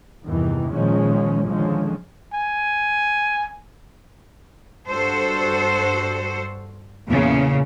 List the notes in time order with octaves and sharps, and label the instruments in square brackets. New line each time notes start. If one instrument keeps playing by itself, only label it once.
[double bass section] E2 G2 C3 D#3 E3
A#2 D#3 F3 G#3 C#4
D3 D#3 F3 G#3 C#4
[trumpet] G#5
[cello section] G2 F#4 A4 C5
E2 A#2 C#3